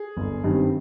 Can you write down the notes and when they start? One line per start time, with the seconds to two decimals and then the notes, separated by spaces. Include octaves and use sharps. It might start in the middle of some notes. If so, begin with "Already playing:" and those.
Already playing: G#4
0.17 G1
0.44 G2 D#3 G3 C4